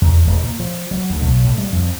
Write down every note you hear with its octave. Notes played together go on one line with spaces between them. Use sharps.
E2
E1
A#2
F3
F#3
D2
B1
A2
G3
F2